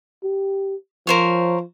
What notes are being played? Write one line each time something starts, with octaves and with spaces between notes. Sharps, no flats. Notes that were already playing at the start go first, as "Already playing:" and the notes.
G4
F3 A#4 C5 C#5